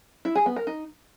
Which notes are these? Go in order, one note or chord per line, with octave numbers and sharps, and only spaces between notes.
E4
G#4
B3
A#4
D#4